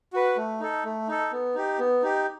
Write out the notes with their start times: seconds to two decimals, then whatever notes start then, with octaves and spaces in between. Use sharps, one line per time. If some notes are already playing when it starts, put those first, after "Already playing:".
0.13 F#4 B4
0.37 A3
0.60 D#4 A4
0.84 A3
1.08 D#4 A4
1.32 B3
1.55 D#4 G4
1.79 B3
2.03 D#4 G4